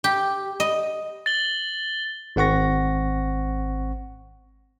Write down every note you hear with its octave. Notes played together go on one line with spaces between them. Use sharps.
G4
D#5
A6 F#7 G7
G#1 C4 F#5 C#6 A#6